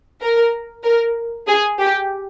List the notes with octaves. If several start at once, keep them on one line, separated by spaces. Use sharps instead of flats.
A#4
A#4
G#4
G4